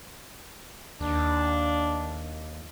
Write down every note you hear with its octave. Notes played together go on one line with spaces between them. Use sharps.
D#2 D4